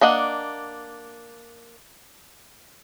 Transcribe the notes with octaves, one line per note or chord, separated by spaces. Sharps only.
A#3 D4 D#5 F#5